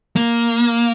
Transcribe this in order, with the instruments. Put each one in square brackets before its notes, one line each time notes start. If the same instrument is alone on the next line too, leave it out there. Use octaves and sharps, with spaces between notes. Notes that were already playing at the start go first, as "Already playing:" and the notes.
[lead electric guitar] A#3